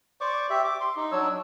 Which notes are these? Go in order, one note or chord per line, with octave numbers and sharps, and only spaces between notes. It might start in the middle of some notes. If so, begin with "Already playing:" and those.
C5 D5 C#6 D6
G4 E5
D6
C6
D#4
F#3 D4 C#5 E6